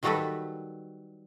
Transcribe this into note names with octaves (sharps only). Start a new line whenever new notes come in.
D#3 F#3 G3 F#4 A4 B4